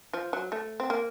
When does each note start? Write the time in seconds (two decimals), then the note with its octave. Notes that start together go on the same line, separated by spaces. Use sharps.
0.13 F3
0.33 F#3
0.52 A3
0.80 C4
0.90 A#3